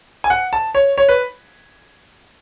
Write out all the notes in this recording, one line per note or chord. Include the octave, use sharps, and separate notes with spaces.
G#5
F#5
A5
C#5
C#5
B4